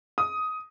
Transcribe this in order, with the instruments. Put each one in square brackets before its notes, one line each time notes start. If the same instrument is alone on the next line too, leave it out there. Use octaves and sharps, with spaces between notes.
[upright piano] D#6